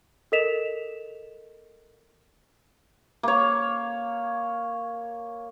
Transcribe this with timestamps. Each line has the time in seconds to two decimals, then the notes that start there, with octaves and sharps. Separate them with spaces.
0.32 A4 A#4 D#5 B6 E7 F7
3.23 A#3 C#5